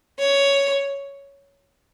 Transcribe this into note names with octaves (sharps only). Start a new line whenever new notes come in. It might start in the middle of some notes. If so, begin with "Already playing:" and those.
C#5